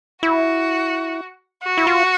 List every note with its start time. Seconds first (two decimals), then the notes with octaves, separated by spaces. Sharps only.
0.23 E4 F#4
1.63 F#4
1.78 E4
1.87 F4